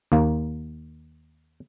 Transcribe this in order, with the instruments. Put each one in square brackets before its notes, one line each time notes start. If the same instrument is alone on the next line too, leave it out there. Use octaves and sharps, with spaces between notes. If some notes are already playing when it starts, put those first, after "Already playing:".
[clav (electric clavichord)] D#2 A#3